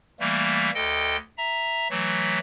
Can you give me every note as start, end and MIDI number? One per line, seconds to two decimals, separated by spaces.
0.20 0.70 52
0.20 0.70 55
0.20 0.70 57
0.20 0.70 58
0.75 1.17 38
0.75 1.17 69
0.75 1.17 75
0.75 1.17 79
1.37 1.88 76
1.37 1.88 82
1.90 2.39 52
1.90 2.39 54
1.90 2.39 57